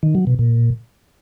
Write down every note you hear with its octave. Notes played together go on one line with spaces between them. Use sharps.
D#3
F#3
B2
A#2